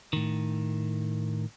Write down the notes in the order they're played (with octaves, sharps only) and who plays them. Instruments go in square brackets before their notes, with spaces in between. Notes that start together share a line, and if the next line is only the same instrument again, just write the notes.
[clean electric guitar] A2 D#3